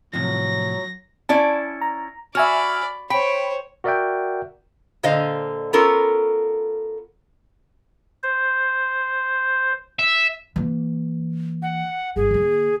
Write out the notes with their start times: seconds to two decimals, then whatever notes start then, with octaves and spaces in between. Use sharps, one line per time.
0.13 A2 C3 F3 F#3 A#6
1.29 C#4 E4 D5 A5
1.81 A#5
2.35 F#4 D5 E5 G#5 B5 F6
3.10 C5 C#5 G5 B5
3.84 F#4 A#4 D5 E5 F#5 G5
5.03 A#2 D3 C5 D#5 F5
5.73 B3 C#4 F4 A4 A#4
8.23 C5
9.99 E5
10.56 E3 A#3
11.62 F#5
12.16 G1 G#4
12.31 D3 A#3